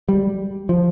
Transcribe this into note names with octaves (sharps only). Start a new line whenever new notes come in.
G3
F3